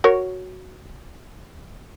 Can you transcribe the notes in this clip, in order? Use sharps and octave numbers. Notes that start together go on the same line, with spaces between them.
F#4 A#4 C#5